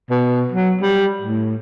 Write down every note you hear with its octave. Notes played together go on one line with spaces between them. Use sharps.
B2
F#3
G3
A2